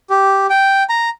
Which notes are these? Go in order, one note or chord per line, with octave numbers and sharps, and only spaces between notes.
G4
G5
A#5